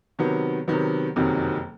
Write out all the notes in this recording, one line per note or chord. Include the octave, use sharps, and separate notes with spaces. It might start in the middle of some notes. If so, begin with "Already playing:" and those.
C3 D#3 F#3 B3
C3 D#3 F#3 B3
F#1 F2 C3 D#3 F#3